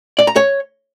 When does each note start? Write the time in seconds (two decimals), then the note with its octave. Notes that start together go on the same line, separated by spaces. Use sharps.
0.19 D5
0.27 A#5
0.36 C#5